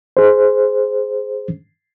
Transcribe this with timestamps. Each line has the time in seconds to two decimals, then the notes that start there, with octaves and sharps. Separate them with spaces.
0.17 G#4 C5